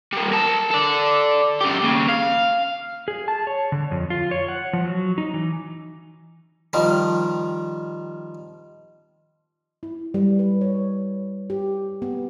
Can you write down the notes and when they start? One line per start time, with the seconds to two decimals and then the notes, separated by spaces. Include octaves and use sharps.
0.13 G3 A#3
0.32 A#4 A5
0.71 A4 D5
1.61 F#2 G4
1.83 D#2 C#3
2.09 F5
3.08 G#4
3.28 A5
3.47 C#5
3.72 D3
3.91 F2
4.10 F4
4.31 C#5
4.48 F#5
4.73 F3
4.85 F#3
5.18 D#4
5.34 E3
6.73 D#3 F3 G3
9.83 E4
10.14 G3
10.39 B4
10.61 C#5
11.50 G4
12.02 B3